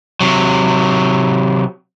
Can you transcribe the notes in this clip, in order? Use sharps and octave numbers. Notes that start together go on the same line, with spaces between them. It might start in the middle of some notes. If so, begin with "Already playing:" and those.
C3 F#3